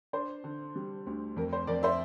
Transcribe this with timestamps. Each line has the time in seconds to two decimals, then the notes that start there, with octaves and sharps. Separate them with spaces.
0.13 D4 C5
0.44 D3
0.76 G3
1.07 D2
1.36 F2 A#4
1.53 C5
1.67 F2 A#4 D5
1.83 C5 E5